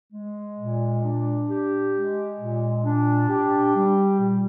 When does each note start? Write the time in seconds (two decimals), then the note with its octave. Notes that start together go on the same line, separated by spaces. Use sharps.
0.13 G#3
0.58 A#2
1.04 D4
1.49 G4
1.94 G#3
2.39 A#2
2.84 D4
3.29 G4
3.75 G3
4.20 A#2